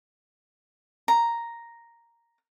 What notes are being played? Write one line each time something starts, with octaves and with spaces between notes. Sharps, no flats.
A#5